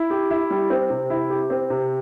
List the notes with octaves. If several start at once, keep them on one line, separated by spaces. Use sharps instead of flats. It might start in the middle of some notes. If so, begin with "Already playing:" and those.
Already playing: E4
G4
E4
G3
C4
C3
E4
G4
C4
C3